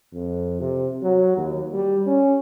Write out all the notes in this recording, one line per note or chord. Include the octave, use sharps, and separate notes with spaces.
F2
C3
F#3
D#2
G3
C#4